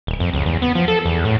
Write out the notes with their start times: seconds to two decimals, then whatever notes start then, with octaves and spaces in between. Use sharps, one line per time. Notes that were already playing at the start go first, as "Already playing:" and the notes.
0.07 D#1
0.20 F2
0.33 C#2
0.46 E2
0.62 B3
0.75 F3
0.88 A4
1.05 E2
1.25 A2